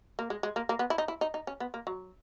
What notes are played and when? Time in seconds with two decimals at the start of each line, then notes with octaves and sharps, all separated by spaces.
0.19 A#3
0.30 G#3
0.43 G#3
0.56 A#3
0.69 A#3
0.79 B3
0.90 E4
0.98 D#4
1.08 E4
1.21 D#4
1.34 D#4
1.47 C#4
1.60 B3
1.74 A#3
1.87 F#3